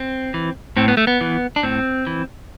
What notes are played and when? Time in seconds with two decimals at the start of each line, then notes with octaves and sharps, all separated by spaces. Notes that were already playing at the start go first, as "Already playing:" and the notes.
Already playing: C4
0.34 E3
0.76 A2 C4
0.88 B3
0.97 A3
1.07 B3
1.21 E3
1.56 D4
1.63 A2 C4
2.07 E3